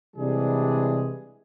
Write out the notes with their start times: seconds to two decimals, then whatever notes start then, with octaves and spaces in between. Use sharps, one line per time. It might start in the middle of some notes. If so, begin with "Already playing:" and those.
0.16 C3 E3 G3 G#3 D4 G#4